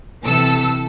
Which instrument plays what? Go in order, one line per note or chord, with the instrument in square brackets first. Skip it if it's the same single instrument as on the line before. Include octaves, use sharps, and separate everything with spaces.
[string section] C3 E3 A4 E6